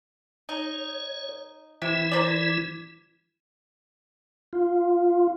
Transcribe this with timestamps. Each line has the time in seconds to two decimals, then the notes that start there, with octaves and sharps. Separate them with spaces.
0.49 D#4 C#5
1.82 C3 E3 E4
2.11 A#4 C5 D5
4.53 F4